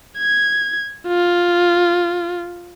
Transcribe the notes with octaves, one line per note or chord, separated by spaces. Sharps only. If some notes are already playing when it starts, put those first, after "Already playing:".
G#6
F4